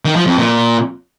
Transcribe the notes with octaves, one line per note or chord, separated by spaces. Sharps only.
D#3
F3
F2
A#2